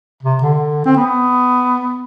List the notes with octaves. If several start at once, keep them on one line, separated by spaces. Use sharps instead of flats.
C3
D3
C4
B3